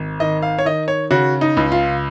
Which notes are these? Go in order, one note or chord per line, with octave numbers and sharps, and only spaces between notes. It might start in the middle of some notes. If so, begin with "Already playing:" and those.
Already playing: G#1
D#3 D#5
F5
C#5
D#3 D#5
C#5
C#3 F#4
D#4
C#2
F4